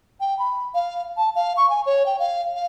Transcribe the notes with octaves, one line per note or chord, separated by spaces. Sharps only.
G5
B5
F5
A5
F5
C#6
G#5
C#5
G5
F5
F5